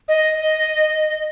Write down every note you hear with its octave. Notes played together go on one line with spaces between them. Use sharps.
D#5